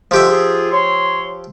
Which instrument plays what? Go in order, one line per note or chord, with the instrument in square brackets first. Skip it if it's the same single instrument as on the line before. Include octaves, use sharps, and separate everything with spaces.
[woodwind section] D3 G#3 [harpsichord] F3 G4 E5
[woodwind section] F4 G#4
C#5 C6